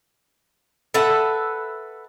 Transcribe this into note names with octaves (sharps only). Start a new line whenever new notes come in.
A4 B4 E5 F#5